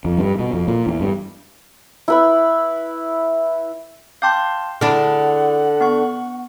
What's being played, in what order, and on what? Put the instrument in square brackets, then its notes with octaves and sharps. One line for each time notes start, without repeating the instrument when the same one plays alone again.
[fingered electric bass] F2
G2
B2
F2
A#2
E2
G2
[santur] E4 B4 E5
[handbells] F5 A5 C6 [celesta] G5 D6 G6
[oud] D3 D4 [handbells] E4 G#4 [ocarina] F#5 [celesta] F6
[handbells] B3 C#6